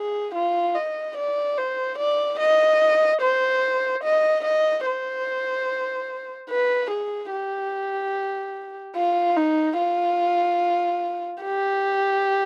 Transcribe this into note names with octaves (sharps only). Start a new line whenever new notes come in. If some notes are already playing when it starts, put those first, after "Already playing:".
Already playing: G#4
F4
D#5
D5
C5
D5
D#5
C5
D#5
D#5
C5
B4
G#4
G4
F4
D#4
F4
G4